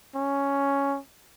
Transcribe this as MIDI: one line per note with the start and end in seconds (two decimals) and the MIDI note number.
0.15 0.98 61